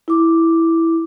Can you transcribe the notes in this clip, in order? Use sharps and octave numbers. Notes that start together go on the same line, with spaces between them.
E4 D6